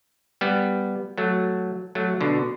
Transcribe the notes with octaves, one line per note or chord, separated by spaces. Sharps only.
G3 B3
F#3 A3
F#3 A3
B2 D3